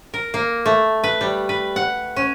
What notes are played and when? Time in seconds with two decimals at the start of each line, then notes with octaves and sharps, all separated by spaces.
0.14 A#4
0.34 A#3
0.66 A3
1.04 B4
1.21 G3
1.49 B4
1.76 F#5
2.16 C#4